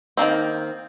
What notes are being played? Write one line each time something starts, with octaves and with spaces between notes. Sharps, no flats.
D#3 F#3 A#3 C4